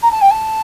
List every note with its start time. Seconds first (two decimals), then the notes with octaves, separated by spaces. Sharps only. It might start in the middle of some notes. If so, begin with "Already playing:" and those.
0.02 A#5
0.11 A5
0.21 G5
0.30 A5